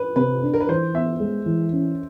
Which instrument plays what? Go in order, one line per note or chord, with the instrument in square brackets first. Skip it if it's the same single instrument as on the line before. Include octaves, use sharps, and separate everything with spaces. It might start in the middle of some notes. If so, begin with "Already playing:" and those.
Already playing: [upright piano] B4
[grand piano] C3 [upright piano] B4
[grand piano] D4
[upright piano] A#4
B4
[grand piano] E3 [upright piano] C5
[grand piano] B3 [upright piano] E5
[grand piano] G#3
E3
C#4